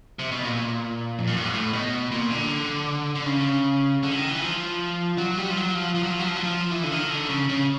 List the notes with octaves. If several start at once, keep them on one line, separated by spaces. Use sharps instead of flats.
C3
B2
A#2
F2
F#2
G2
G#2
A2
B2
A#2
D3
D3
C#3
D3
E3
D#3
E3
F3
F#3
G3
F3
F#3
F3
F3
F#3
F3
F#3
F3
F#3
F3
E3
D3
D#3
D3
C#3
C#3